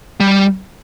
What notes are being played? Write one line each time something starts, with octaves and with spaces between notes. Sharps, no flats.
G3